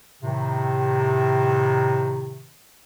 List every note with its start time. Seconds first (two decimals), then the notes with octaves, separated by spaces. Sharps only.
0.23 A2 C3 D#3